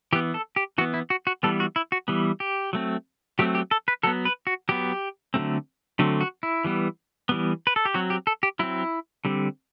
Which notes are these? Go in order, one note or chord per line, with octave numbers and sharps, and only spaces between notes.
E3 B3 G4
A4
G4
E3 B3 F#4
E4
F#4
F#4
E3 G3 B3 A4
F#4
E4
F#4
E3 G3 B3
G4
F#3 A3 C4
F#3 A3 C4 G4
G4
A4
B4
F#3 B3 A4
B4
F#4
F#3 B3 G4
D3 F#3 A3 C4
D3 F#3 A3 C4
F#4
E4
E3 G3 B3
E3 G3 B3
B4
A4
G4
F#3 C4 F#4
G4
A4
G4
F#3 C4 E4
D3 G3 C4